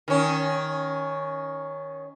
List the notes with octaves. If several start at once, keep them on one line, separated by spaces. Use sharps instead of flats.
D#3 C#4